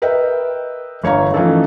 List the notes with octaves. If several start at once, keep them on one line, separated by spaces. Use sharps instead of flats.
A#4 B4 D#5 E5 G5
G1 C#5 F5 A#5
E3 F3 A3 C#4 D#4 A4